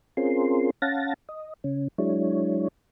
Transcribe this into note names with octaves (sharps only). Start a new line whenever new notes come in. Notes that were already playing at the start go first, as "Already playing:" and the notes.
C4 C#4 F4 G#4 A#4 C6
C#4 F5 F#5 A5 A6 A#6
D#5
C#3 C#4
F#3 G#3 D4 E4 C#5